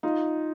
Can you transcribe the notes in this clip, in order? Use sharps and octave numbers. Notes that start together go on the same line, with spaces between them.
D#4 F4